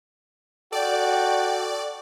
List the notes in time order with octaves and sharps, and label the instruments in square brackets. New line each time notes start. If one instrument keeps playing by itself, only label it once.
[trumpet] F#4 [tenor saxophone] A4 [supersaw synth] D5 [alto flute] G5